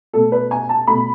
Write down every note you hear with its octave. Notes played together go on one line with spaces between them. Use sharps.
B2 A3 A4
B4
G#5
A5
B2 A3 B5